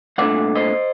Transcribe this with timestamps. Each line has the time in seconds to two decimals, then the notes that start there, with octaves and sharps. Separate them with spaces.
0.18 C2 A#2 A3 D4 D5 F#5
0.55 C5 D#5